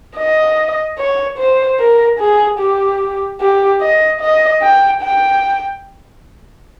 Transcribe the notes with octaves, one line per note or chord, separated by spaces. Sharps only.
D#5
C#5
C5
A#4
G#4
G4
G4
D#5
D#5
G5
G5